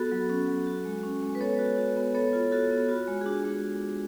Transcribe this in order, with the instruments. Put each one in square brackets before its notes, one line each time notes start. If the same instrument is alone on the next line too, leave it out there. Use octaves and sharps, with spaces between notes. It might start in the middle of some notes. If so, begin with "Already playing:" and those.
Already playing: [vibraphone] B3 F#4 A4
F#3
C#4
F#3
F#4
G#3
C#4
G#3
B4
B3 A4 C#5
F#4
F#4
B3
B3 A4 C#5
F4
F4 F#4 A4
B3
F4 F#4
G#3
G#4
D4 F#4
G#3